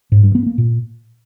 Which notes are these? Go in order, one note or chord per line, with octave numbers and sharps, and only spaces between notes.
G#2
G2
B3
A#3
A#2